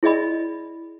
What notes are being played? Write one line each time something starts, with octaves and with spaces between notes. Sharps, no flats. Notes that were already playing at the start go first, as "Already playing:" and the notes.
E4 G#4 D5 D#5 B5